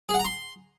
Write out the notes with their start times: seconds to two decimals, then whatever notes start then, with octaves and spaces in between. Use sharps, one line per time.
0.09 G#4
0.14 F#5
0.19 A#5
0.25 C6